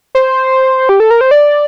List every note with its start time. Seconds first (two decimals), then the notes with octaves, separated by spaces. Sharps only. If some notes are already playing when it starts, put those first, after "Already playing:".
0.15 C5
0.89 G4
1.00 A4
1.11 A#4
1.21 C5
1.31 D5